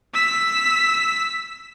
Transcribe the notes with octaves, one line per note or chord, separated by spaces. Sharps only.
E6 B6